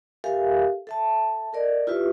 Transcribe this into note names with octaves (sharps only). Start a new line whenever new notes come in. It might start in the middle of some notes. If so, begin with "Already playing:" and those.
G4 A4 A#4 E5 F5 G#5
A4 E5 A5
A4 A#4 D5 D#5
E4 F4 G4 B4 E5